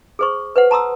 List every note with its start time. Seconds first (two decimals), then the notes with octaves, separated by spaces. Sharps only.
0.19 G#4 C5 C#6
0.56 B4 C5 F#5
0.71 A5 A#5 C6 D#6 E6